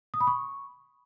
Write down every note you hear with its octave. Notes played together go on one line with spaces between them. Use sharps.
D#6
B5
C#6